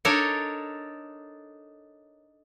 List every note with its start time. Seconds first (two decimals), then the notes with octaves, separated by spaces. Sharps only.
0.05 D4 D#4 A4 A#4 C#5